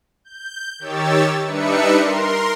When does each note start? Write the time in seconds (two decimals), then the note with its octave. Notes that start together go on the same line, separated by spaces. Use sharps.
0.25 G6
0.79 D#3 G4 C#5 E6 A6
1.44 G3 D4 D#4 B4 E5 C#7
1.96 A#4 C6